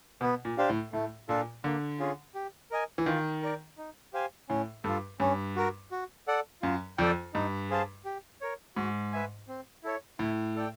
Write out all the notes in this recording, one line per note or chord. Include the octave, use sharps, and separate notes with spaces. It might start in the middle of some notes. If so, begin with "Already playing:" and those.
B2 B3
A#2
D4 G4 C5 F5
A2
A2 A3
A#2 D4 F4 A4
D3 A#3
C#4 F4 G#4
G4
A#4 D#5 G#5
E3
D#3 F4
A#4 D5
D#4
G4 C5 F5 G#5
A2 C#4
G2 F4 A4
G2 C#4
F#4 A#4
F#4
A4 D5 F#5
F#2 F4
F2 A4 D5 G5
G2 D#4
G#4 C5 F5 A5
G4
A#4 C#5
G#2 F#4
B4 E5 G#5
C4
E4 A4 C#5
A2 E4
A4 D5 G5